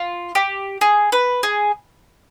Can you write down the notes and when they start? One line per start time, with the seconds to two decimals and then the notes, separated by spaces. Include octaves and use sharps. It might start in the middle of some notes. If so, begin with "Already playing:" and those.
Already playing: F4
0.35 G4
0.81 G#4
1.12 B4
1.43 G#4